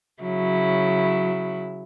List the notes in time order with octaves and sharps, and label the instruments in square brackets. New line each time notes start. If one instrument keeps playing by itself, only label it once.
[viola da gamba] C#3 F#3 E4